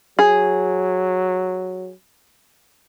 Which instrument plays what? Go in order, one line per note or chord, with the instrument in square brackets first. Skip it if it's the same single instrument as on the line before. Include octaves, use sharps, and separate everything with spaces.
[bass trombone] F#3 [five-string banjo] G#4